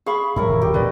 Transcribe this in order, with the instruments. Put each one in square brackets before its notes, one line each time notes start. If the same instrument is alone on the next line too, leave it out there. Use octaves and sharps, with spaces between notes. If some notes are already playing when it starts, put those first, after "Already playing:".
[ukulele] G#4 F5 B5 [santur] C#6
[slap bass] F#2 [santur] E4 A#4 C#5
[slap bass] D#1 C#3
[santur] G4
[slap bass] D2 B2 [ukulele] B4 D5 D#5